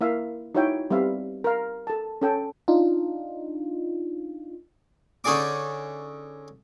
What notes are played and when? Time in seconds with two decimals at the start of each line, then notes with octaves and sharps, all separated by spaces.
0.01 A#3 E4 E5 F5
0.55 D#4 E4 F#4 C#5 E5 G5
0.90 G3 B3 C4 E5 F5
1.44 A#4 F5
1.87 A4 A5
2.22 C#4 A4 G5
2.68 D4 D#4 F4
5.24 D3 C#4 D#4 G#4 D5 D6